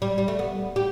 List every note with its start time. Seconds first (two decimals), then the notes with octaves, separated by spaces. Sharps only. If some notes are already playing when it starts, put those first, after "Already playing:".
0.02 G3
0.18 G3
0.28 A3
0.39 B3
0.76 G4